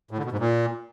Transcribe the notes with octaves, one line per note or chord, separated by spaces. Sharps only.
A2
D3
B2
G#2
A#2